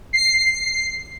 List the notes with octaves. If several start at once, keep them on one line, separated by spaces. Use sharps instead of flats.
C7